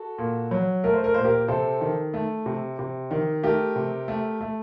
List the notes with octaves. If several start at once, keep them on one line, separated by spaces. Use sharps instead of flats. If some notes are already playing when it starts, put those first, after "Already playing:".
Already playing: F#4 A4
A#2
F#3
A3 A#4
C5
A#4
A#2 C5
G4 A#4
C3 A4 C5
D#3
A3
C3
C3
D#3
A3 G4 A#4
C3
A3
A3